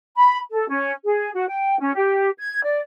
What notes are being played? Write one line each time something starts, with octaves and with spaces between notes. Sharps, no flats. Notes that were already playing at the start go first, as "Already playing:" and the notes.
B5
A4
C#4
G#4
F#4
G5
C#4
G4
G#6
D5